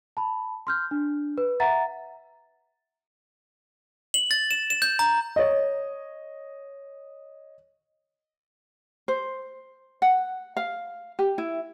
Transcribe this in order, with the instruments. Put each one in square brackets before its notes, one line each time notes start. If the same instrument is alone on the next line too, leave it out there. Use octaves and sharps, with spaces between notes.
[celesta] A5 B5
C6 F6 G6
D4
B4
E5 F#5 A#5 A6
[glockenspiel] F#7
A6
E7
E7
G6
A#5
[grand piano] C#5 D#5
[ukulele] C5
F#5
F5
G4
E4